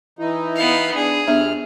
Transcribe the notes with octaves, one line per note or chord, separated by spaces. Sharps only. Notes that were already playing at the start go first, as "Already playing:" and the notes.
E3 D#4 E4
B3 F5
D4 G#4
F2 B3 D4 G4 E5 F6